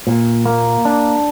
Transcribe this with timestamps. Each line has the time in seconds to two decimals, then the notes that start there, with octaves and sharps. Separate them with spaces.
0.07 A#2
0.46 A#3
0.85 D4